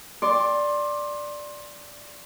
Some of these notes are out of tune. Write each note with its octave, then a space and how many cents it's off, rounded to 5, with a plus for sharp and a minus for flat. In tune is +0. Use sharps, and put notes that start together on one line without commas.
D5 +0 C6 +25